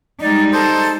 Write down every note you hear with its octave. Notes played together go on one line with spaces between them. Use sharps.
G3 G#3 D#4 D5
A4 C5